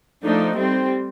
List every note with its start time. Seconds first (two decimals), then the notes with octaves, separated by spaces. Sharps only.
0.24 F3 A3 D4 D#4
0.56 G3 C4